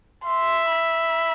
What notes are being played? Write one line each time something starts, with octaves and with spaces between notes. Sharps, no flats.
E5 C6
B5